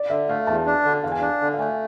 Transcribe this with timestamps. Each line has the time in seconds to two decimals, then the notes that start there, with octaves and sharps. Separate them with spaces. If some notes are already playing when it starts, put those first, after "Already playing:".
Already playing: D5
0.10 D3 E5
0.29 A3 F5
0.47 E2 A5
0.66 D4
0.85 D3
1.03 E2 F5
1.12 G#5
1.20 D4 F5
1.41 D3
1.54 F5
1.59 A3 G#5